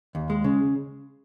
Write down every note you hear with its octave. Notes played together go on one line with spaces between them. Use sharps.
D#2
G#3
C#3